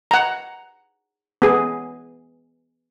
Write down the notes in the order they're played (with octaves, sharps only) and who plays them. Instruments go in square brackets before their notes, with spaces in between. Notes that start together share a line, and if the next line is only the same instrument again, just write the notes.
[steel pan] F#5 A#5
B3 G#4